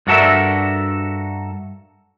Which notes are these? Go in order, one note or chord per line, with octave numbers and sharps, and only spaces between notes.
G2 D4 F#4 A4 A#4 E5